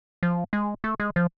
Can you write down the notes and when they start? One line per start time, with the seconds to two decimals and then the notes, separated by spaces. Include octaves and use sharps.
0.23 F3
0.53 G#3
0.84 A3
1.00 G#3
1.16 F3